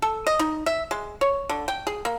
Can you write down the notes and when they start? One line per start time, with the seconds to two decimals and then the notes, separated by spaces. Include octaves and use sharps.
0.02 A4
0.27 D#5
0.39 D#4
0.66 E5
0.91 G#3
1.21 C#5
1.49 D3
1.68 G5
1.87 G#4
2.05 A#3